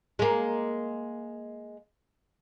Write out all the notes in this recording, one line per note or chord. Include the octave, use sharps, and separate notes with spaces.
G#3 A#3